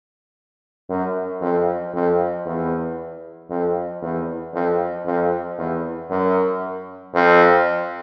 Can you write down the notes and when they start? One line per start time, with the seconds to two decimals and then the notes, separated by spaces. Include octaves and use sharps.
0.89 F#2
1.41 F2
1.93 F2
2.46 E2
3.50 F2
4.02 E2
4.54 F2
5.06 F2
5.58 E2
6.10 F#2
7.14 F2